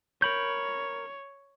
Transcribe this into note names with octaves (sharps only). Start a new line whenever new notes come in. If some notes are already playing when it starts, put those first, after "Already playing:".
A#4 C#5 B5 G6